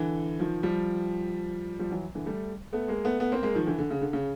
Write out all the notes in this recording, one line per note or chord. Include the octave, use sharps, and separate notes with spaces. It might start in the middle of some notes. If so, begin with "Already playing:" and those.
Already playing: D3 E3
D#3 F3
F3 G3
F3 G3
E3 F#3
D3 E3
G3 A3
A3 B3
G#3 A#3
A3 B3
A3 B3
A#3 C4
G#3 A#3
D#3 F3
D3 E3
D3
C#3
D3
C#3